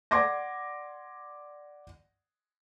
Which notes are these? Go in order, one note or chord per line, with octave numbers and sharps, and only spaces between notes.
D5 F#5 C6 D6 G#6 A#6